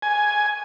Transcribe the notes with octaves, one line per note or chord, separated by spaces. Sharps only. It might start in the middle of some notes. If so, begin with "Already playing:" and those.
G#5